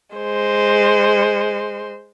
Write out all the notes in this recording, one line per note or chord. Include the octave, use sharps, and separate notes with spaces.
G#3 C5